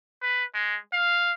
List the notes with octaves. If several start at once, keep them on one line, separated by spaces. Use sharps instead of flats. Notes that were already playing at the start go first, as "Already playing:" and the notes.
B4
G#3
F5